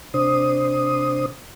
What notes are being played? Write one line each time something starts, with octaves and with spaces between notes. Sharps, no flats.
C3 D4 C5 D#6